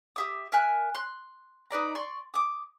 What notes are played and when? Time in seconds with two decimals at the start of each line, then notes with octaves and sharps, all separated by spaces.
0.16 G4 E5 D#6
0.52 A#4 E5 G#5 F#6
0.95 C6 F#6
1.71 D#4 B4 D5 A#5
1.95 D5 C6 C#6
2.34 D6 D#6